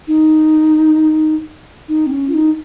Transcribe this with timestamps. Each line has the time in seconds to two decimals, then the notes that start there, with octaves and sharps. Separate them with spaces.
0.08 D#4
1.88 D#4
2.06 C4
2.12 C#4
2.29 F4
2.34 D#4